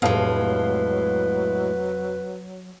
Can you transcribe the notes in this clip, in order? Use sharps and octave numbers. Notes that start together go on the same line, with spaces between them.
F1 A2 F#3 G#3 B4 F5 A5